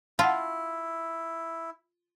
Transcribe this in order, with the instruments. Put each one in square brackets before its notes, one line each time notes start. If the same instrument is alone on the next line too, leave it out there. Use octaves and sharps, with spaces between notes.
[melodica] E4 [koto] F4 [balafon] F#5 A5